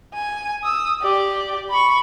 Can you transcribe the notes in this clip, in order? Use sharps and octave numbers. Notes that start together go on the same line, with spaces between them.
G#5
D#6 E6
G4 D5
B5 C#6